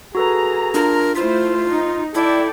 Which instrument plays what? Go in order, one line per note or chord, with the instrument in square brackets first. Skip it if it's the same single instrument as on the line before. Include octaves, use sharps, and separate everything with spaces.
[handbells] F#4 A4 B4 [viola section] G#4 A#5
[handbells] D4 F4 [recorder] A#4
[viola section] A3 E4 C5 [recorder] F4 [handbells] B6
[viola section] D#4
[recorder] E4 [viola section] A4 D5 G5